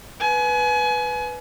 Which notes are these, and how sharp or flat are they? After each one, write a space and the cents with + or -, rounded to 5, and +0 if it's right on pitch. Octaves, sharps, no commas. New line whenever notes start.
B4 +0 G#5 +30